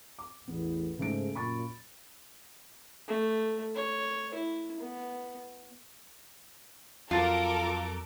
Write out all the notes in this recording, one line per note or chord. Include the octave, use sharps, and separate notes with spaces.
D6
A1 E2 A2 B3
G#2 C#3 A3 D7
F#2 A#2 B5 C#6 A6
A3
C#5
E4
B3
F2 F#3 F4 A4 A#4 D6 A6